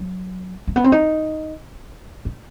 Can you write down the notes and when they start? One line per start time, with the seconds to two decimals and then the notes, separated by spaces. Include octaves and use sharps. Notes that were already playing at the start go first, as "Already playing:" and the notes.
Already playing: F#3
0.68 A3
0.76 B3
0.84 C4
0.92 D#4
2.25 D#4